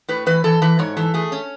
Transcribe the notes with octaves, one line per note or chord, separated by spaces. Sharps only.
A2 B4
E3 B4
E3 A4
E3 B4
G#2 C#5
E3 A4
A3 G#4
C#4